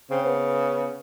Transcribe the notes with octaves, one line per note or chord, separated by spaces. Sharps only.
C#3 C4
B3